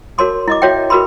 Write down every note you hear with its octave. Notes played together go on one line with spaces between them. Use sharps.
F#4 A#4 C#5 A5 C6 D6
E4 D#5 D6
F#4 C#5 E5 G5
F#4 G#4 A#4 B4 B5 C6